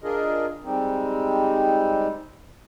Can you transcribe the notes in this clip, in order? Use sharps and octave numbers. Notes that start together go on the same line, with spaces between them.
D4 F4 G#4 A#4 D#5
G3 G#3 C4 D#4